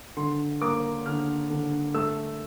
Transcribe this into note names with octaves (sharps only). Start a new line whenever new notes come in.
D3 C6
A#3 D6
D3 F6
D3
A3 E6